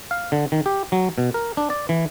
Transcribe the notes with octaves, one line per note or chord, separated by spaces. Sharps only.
F5
D3
D#3
G4
F#3
B2
A#4
D4
D5
E3